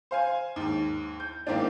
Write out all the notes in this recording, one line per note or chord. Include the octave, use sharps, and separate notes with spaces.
C5 F5 G#5
D#2 G#2
G6
E2 G#2 A#3 C4 D4